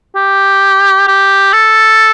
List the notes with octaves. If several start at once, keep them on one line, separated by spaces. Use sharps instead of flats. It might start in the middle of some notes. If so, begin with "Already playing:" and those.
G4
G4
A4